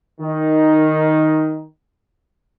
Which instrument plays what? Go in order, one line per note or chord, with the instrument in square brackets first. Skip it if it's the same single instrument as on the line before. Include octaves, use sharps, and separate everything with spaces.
[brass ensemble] D#3 D#4